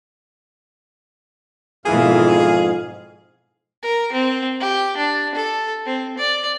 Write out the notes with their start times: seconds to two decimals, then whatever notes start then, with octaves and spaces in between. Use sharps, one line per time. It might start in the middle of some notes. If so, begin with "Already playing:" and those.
1.86 F2 G#2 B2 D#3 E3 G#4 F5
3.82 A#4
4.12 C4
4.60 G4
4.97 D4
5.34 A4
5.86 C4
6.18 D5